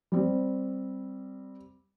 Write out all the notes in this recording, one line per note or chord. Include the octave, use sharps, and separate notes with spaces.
G3 C4